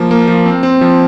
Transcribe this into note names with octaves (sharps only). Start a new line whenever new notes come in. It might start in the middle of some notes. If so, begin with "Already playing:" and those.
Already playing: F3 A#3
A#3
F3
C4
C4
F3